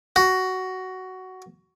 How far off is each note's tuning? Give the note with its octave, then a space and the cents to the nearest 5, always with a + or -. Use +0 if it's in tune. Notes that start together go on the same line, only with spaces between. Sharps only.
F#4 +10